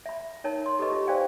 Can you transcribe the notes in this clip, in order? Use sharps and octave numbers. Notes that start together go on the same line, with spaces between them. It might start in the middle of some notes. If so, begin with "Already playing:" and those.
E5 B5
D#4 A#4 C#5 A5
C6
G4 A4 B4 D#5 C#6
F4
C5 D5 F5 G5 G#5